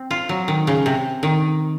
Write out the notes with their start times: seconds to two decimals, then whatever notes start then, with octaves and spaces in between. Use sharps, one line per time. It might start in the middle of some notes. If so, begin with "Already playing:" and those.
Already playing: C4
0.11 F4
0.29 F#3
0.48 D#3
0.67 C#3
0.86 C3
1.23 D#3